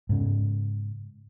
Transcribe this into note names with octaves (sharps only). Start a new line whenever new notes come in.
G#2 C#3